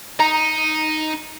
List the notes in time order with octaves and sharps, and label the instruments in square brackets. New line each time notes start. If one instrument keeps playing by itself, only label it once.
[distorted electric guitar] D#4 [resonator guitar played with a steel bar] A#5